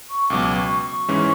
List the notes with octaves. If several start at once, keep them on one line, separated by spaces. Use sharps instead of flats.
C#6
C#2 B2 F#3 D6
C#6
D6
C#6
G#2 E3 G#3 C#4